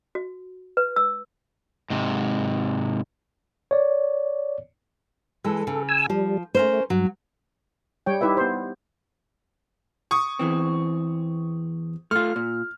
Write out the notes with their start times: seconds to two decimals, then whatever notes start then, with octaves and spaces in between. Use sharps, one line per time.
0.15 F#4
0.77 B4
0.96 E6
1.90 G#2 C3
3.71 C#5 D5
5.44 E3 G#3 A4
5.67 C#3
5.89 G#5 E6
6.10 F3 G3
6.55 A3 C#4 A#4 C5
6.90 G2 F#3
8.06 G3 C#5 G5
8.21 D#4 E4 G4 B4 E5
8.37 B3 C5
10.11 C#6 D#6
10.39 E2 E3 C4
12.11 A3 F4 F6
12.36 A#2